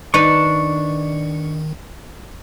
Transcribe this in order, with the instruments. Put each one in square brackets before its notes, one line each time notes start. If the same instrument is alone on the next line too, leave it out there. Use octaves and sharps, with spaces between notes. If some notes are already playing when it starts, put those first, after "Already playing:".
[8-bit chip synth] D#3 [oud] D4 D#4 B4 [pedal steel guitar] C#6